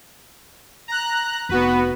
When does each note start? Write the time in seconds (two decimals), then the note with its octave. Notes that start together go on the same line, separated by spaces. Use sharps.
0.88 A#5 F#6
1.49 F1 B3 F#4 B4